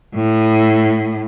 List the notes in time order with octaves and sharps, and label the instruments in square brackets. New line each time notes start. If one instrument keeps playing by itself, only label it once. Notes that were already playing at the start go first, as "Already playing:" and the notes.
[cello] A2